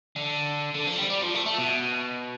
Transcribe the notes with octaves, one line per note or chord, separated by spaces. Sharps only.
D3
D3
F3
G3
G3
F3
A3
A3
B2